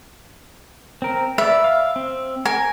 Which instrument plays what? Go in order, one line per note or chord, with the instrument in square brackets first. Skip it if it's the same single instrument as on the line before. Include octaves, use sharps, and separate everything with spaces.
[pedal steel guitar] C4 A#4
[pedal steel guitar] B4 D5 [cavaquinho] E5
[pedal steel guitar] F5
C4
[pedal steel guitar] A#4 [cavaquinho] G#5